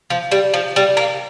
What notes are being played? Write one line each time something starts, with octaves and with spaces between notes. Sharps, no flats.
F3
G3
F3
G3
A#3